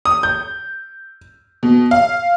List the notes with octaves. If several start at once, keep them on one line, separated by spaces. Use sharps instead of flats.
D#6
G6
B2
F5